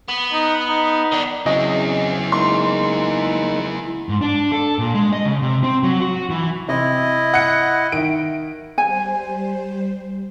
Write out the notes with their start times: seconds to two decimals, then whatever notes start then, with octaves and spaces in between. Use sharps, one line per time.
0.08 B3
0.32 D#4
0.69 D#4
1.12 D#3 D4
1.46 C#3 F#3 C4 E4 G#4 D#5
2.32 G#3 A#3 D#4 C6
4.09 G#2
4.21 D4
4.52 A4
4.79 A#2
4.94 G#3
5.13 D#5
5.25 C#3
5.42 C3
5.63 C4
5.83 F#3
6.01 F#4
6.30 E3
6.69 C3 E4 D#5
7.34 F#5 C#7
7.92 D#3 E5 D7
8.78 G3 C5 G#5